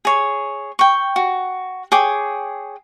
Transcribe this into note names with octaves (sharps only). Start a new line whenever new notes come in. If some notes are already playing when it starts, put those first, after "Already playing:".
G#4 C#5
G5 C#6
F#4
G#4 C#5 G5 D6